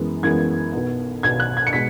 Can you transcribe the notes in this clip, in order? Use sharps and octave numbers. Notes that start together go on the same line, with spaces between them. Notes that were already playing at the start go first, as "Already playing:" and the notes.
Already playing: F#2 E3 G#3 B3
F#2 E3 G#3 B3 G#6
B1 B2 B3
B1 B2 B3 G#6
F#6
G#6
C#7
B2 G#3 B6